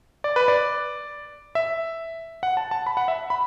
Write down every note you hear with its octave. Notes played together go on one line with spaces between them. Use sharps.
D5
B4
D5
E5
F#5
A5
A5
B5
F#5
E5
B5